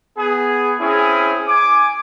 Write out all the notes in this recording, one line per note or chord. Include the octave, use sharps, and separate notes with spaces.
B3 G#4
C4 C#4 E4 G#4
G#5 D6